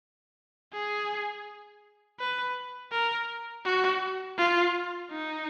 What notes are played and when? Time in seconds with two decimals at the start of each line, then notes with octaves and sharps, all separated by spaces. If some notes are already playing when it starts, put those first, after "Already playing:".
0.73 G#4
2.20 B4
2.92 A#4
3.65 F#4
4.38 F4
5.11 D#4